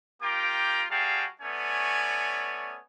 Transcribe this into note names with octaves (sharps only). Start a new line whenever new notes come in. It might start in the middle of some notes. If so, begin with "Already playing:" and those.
A#3 F4 G4 G5 A#5 D6
G3 F#4 G#4 F5 G5 A5
A3 B3 C#4 C#5 D5 G#5